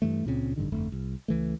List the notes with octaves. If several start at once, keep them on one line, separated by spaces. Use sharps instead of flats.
G2 E3 A3
C#2 A#2 C#3 C4
A1 G2 D3 D#3
G1 F2 D3 A3
C2
C#2 E3 A3